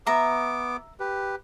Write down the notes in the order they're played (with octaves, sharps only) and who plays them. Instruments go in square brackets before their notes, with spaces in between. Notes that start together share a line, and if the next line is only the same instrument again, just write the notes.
[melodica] B3 D6 [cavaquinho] E5 A#5
[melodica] G4 B4